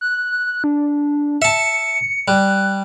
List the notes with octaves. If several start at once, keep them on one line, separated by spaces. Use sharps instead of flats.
F#6
D4
E5 A5 C#7
G3 F#6